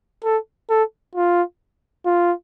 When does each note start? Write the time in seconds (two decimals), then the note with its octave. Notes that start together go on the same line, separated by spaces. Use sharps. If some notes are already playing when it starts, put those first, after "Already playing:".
0.24 A4
0.70 A4
1.15 F4
2.06 F4